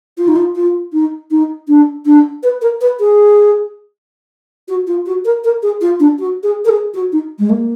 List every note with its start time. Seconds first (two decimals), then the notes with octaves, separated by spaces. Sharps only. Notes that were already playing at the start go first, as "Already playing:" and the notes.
0.18 F4
0.28 D#4
0.36 F4
0.55 F4
0.93 D#4
1.31 D#4
1.68 D4
2.06 D4
2.43 B4
2.61 A#4
2.81 B4
3.00 G#4
4.68 F#4
4.87 F4
5.06 F#4
5.25 A#4
5.44 A#4
5.63 G#4
5.81 F4
6.00 D4
6.19 F#4
6.43 G#4
6.65 A#4
6.69 G#4
6.94 F#4
7.12 D#4
7.39 G#3
7.50 A#3